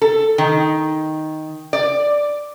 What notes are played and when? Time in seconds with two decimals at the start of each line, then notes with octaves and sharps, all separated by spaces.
0.02 A4
0.38 D#3
1.73 D5